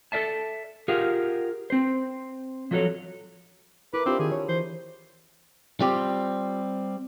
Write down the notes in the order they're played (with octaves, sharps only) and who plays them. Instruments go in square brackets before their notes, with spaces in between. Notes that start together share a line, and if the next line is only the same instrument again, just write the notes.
[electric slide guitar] A4 A#4 D5 E5 A5
F4 G4 G#4 A#4 F5 F#5
C4 C5
F3 F#3 A3 F#4 A4 C#5
[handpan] E4 A#4 [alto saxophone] B4 [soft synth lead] D6
[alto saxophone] C4 [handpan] D4 F4 G4
[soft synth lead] D#3 [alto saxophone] G#4
[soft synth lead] C#5
[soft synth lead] E3 [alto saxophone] C5
[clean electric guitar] G3 C4 [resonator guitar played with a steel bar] F4 G4 G5